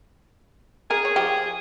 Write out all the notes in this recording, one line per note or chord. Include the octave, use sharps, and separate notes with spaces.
G#4 A#4
C#5
F3 G4